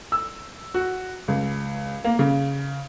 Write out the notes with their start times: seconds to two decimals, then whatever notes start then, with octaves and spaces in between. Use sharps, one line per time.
0.12 E6
0.74 F#4
1.28 C#2
2.04 A#3
2.19 C#3